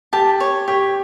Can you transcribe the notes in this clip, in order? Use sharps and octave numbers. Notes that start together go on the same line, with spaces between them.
G4 A5
C#5
G4 C#5